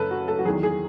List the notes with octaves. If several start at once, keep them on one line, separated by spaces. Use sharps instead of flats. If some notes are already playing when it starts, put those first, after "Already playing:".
Already playing: F#2 C#3 A4 B4
F#4
A4
F#4
E2 D#3 F#3 G#4
G#4